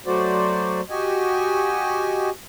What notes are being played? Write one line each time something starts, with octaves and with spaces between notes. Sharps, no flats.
F#3 A3 F#4 C5 D5
F#4 G4 D#5 G#5